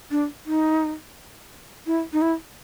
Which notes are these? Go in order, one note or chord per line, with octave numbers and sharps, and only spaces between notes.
D4
D#4
E4
D#4
E4